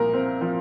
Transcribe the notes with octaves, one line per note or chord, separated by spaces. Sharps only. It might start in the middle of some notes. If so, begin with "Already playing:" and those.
Already playing: C2 A#2 F3 A#4
C4
F3